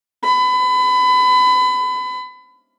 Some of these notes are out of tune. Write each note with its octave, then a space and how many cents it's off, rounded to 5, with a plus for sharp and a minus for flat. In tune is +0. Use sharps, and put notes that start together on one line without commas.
B5 +30